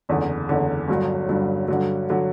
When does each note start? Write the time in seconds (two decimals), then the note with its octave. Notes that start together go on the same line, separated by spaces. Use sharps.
0.09 F#1 E2 D3
0.49 F#1 E2 D3
0.88 G1 G2 F#3
1.29 G1 G2 F#3
1.68 G2 D3 F#3
2.10 D3 F#3